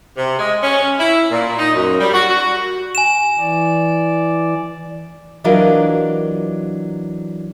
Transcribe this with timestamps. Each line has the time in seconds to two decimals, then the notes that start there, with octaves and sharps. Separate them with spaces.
0.17 C3
0.39 G#3
0.61 C#4
0.99 E4
1.31 A#2
1.59 D#4
1.74 F#2
2.00 G3
2.14 F#4
2.28 F#4
2.95 G#5 E7
3.39 E3 D5
5.44 E3 F#3 D4 F4 A#4 D#5